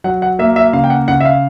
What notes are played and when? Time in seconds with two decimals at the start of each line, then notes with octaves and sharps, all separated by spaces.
0.04 F#3 F#5
0.22 F#5
0.39 A#3 E5
0.56 E5
0.73 C#3 F5
0.84 G5
0.90 F#5
1.08 C#3 F#5
1.20 E5
1.25 F5